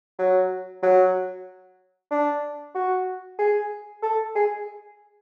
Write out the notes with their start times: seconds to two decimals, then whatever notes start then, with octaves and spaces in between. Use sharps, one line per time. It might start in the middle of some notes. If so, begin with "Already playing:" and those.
0.19 F#3
0.83 F#3
2.11 D4
2.75 F#4
3.39 G#4
4.03 A4
4.35 G#4